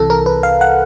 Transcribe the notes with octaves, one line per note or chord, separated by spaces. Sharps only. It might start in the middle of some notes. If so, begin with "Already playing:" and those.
Already playing: C2 C3 E3 A4
A#4
B4
F5
F#5